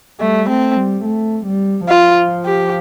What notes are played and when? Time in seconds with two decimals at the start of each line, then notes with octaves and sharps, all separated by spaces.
0.20 G3 A3
0.48 A3 C4
0.76 G3
1.05 A3
1.46 G3
1.89 F3 F4
2.45 G4